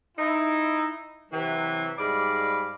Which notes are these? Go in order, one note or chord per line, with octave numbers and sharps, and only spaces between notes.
D#4 E4
C3 E3 F#3
G#2 G3 D5 F5 B5